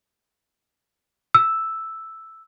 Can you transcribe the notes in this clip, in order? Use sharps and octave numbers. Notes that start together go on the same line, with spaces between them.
E6